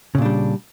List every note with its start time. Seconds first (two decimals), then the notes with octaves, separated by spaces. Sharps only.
0.15 C#3
0.18 A#2
0.22 D4
0.25 G3